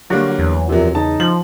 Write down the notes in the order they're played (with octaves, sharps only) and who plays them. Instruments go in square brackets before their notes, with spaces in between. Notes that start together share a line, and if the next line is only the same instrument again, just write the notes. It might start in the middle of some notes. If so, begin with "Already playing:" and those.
[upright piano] D3 G3 A#3 [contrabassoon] F#3 [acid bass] F#4
[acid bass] E2
[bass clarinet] F#2 [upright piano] C3 F#3 [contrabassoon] F3
[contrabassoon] C#3 [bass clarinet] D#4 [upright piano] A5
[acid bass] F3 [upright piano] F#7